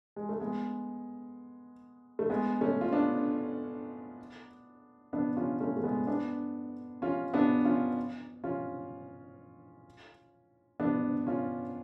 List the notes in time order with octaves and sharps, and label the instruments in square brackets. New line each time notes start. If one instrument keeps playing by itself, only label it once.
[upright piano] G#3
A3
G#3 B3
A3
G#3 B3
A3 C#4
F4
B3 D4
B3 D4
C#4 F4
A3 C#4
A3
G#3 B3
B3 D4
C#4 F4
B3 D4
C#4 F4
C#4 F4
B3 D4
C#4 F4